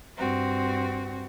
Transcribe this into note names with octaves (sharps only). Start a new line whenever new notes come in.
G2 C4 F#4